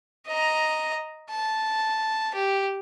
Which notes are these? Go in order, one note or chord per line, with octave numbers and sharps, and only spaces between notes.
D#5 A#5
A5
G4